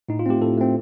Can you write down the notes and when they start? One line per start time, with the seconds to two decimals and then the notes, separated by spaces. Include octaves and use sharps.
0.09 A2 D#4
0.19 F4
0.26 A3 C4 G4
0.41 A2 A4
0.58 A3 C4